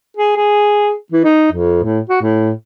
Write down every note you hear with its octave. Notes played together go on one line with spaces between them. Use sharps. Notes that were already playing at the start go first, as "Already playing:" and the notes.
G#4
G#4
E3
D#4
F2
A2
F#4
A2